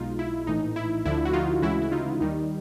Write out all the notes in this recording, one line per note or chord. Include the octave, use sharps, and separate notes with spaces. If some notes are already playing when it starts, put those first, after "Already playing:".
Already playing: B1 B2 G#3 D#4 F4
E4
A#1 A2 E3 D#4
E4
D2 D3 F3 E4
F#4
D#4 F4
D2 C#3 E3 G#3 E4 F#4
E4
D#4 F4
D#2 D#3 G3 D#4